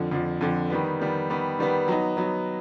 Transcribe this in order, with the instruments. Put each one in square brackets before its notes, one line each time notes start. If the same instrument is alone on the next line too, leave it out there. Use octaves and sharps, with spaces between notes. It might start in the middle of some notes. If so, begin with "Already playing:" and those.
Already playing: [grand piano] F2 D3 F3
F2 D3 F3
F2 D3 F3
D#3 G3 B3
D#3 G3 B3
D#3 G3 B3
D#3 G3 B3
F#3 B3 D#4
F#3 B3 D#4